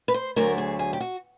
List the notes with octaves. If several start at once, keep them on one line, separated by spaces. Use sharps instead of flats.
B4
C5
D2 D3 F#3 A3 A#4
G#4
G#4
G4
F#4